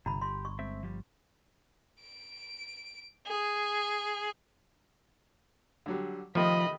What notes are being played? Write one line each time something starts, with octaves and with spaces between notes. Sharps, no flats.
G1 C3 A#5 B5
G4 C6
C#6
G#3 C4 E5
F3 G3
D7
G#4
D3 F#3 G3
C3 D#3 F3 A3 D#5 B5